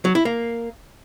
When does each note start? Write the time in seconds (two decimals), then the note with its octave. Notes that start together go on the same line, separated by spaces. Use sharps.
0.05 F#3
0.15 E4
0.25 A#3